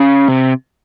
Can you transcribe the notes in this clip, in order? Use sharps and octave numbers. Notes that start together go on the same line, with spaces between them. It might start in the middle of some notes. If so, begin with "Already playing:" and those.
Already playing: C#3
C3